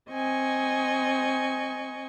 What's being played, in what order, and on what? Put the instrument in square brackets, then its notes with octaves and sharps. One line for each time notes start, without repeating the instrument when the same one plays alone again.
[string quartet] C4 D#5 G#5 C#6